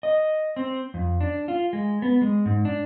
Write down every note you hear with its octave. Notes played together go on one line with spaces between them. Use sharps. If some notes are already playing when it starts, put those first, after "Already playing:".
D#5
C4
F2
D4
F4
G#3
B3
G#3
G#2
D4